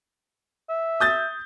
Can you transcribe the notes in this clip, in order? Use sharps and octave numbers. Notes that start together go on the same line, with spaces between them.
E5
D#6 G6 A6